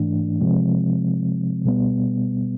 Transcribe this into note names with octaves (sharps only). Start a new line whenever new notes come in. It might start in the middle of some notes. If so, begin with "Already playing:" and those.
Already playing: G#2 E3 A3 D4
C3 F3 G#3 C4
B2 G3 B3